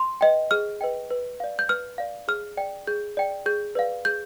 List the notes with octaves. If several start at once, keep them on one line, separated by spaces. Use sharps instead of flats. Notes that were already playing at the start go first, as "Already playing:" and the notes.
Already playing: C6
B4 D#5 G5
G#4 F6
B4 D#5 G5
B4
D5 F5
G6
B4 F6
D5 F5
G#4 F6
D5 G5
G#4 G6
D5 G5
G#4 G6
B4 D5 F5
G#4 G6